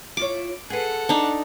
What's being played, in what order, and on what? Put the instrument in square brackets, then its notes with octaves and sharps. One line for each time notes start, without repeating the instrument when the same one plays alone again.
[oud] E4 F4 C#5 [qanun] D6
[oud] G#4 B4 [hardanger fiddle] A4 F#5
[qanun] D4 D#4